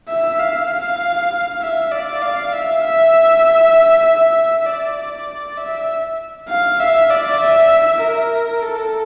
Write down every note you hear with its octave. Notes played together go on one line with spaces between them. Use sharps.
E5
F5
E5
D5
F5
E5
E5
E5
D5
E5
F5
E5
D5
E5
A#4
A4